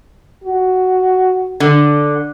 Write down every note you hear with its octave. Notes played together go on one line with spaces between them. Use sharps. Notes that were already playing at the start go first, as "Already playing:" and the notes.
F#4
D3